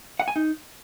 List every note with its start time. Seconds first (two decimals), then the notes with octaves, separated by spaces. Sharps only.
0.20 F#5
0.28 G#5
0.36 D#4